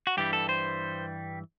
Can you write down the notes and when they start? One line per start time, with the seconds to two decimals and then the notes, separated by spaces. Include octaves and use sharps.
0.07 F#4
0.17 G2 E3 G3 G4
0.33 A4
0.49 C5